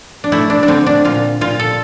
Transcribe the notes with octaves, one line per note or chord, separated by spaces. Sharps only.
D4
A3 E4
D4
D4
D3 C4
D4
A#2 F4
A#2 F4
A4